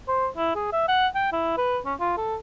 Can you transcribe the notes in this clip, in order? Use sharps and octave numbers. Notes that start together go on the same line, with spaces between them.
C5
E4
G#4
E5
F#5
G5
E4
B4
C#4
F4
A4